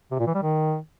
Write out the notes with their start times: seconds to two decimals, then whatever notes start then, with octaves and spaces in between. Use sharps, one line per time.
0.11 C3
0.19 A#2
0.27 E3
0.35 G3
0.42 D#3